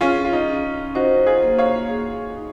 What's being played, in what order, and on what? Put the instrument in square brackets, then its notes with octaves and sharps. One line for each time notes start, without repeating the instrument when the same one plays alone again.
[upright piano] C#4 F4 [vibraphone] G#4
[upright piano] F4
D#4
[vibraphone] C#4
[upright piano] D#4 F#4 [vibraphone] C5
[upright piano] F4 G#4
[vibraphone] A#3
[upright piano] C#5 F5
[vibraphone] G#4
D#4